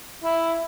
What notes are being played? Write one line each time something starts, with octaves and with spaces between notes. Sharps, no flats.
E4